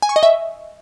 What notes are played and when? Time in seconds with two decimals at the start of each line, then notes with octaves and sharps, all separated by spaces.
0.02 G#5
0.09 C#6
0.16 D#5
0.23 E5